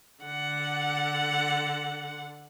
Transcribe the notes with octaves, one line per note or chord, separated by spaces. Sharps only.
D3 F#5